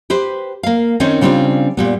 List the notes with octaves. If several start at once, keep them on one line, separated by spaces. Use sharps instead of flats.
G4 B4 C5
A#3 F5
D#3 C4 C#4 D#4 C5 C#5
C#3 G3 C4 D4 F4
A#2 G3 B3